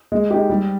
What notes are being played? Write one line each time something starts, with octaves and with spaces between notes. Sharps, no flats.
G#3
D#4 G4
G3